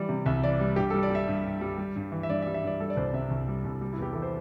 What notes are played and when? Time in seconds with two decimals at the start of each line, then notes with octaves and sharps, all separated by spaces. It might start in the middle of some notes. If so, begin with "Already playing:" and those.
Already playing: E3 G3 D5
0.09 C3
0.26 C2 E5
0.44 E3 D5
0.61 G3
0.76 G2 G4
0.90 G3 A4
1.03 D5
1.10 G3 E5
1.28 G2
1.44 G2
1.61 G3
1.78 G3
1.96 G2
2.12 E3
2.23 E5
2.29 G2 D5
2.42 E5
2.47 G3
2.54 E5
2.63 G2 D5
2.80 G3 A4
2.90 D5
2.97 C2 C5
3.13 C3 E5
3.30 C2
3.48 G3
3.65 C2
3.81 G3
3.93 E4
3.98 E2 G4
4.13 E3 A4
4.22 C5